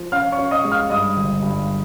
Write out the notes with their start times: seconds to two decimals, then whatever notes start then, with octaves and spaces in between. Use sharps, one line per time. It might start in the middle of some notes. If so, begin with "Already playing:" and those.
Already playing: F3
0.12 C#4 F5 F6
0.32 C#5 C#6
0.38 C#4
0.51 D#5 D#6
0.64 G#3
0.71 F5 F6
0.90 G2 D#5 D#6
1.17 G1
1.43 G2